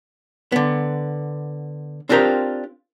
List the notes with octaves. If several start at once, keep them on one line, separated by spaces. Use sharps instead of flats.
D3 B3
C4 D4 F4 G4 A#4 C5